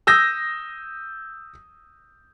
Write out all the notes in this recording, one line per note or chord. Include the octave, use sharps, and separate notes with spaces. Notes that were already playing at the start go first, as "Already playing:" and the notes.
D#6 E6 G6 A#6